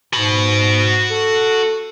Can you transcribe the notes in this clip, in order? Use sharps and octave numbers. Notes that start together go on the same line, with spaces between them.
G#2 F#4 B5
A4